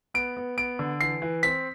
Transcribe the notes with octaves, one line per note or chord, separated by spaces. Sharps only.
B3 D7
B3
B3 D7
D3
E3 C7
E3
C4 B6